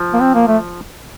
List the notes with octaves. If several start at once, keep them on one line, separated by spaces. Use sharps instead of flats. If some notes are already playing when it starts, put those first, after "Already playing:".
Already playing: F3
A#3
C4
A#3
A3